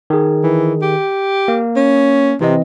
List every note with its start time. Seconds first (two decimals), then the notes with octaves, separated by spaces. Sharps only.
0.10 D#3 G#4
0.43 E3
0.82 G4
1.48 A#3
1.76 C#4
2.41 C3 E3 C4 D#5